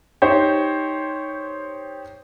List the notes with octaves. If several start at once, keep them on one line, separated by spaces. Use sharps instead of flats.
D#4 G4 C5 C#5